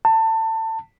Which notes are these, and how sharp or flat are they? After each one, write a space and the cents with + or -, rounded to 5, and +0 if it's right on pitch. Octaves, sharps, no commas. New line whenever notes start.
A5 +25